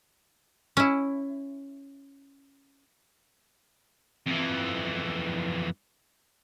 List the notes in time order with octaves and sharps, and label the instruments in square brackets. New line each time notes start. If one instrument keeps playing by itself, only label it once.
[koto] C#4 E4
[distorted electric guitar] F2 E3